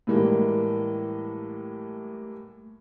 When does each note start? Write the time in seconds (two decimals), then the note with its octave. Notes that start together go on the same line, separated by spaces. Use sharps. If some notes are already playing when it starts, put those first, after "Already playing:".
0.07 A2 E3 G3 G#3 A#3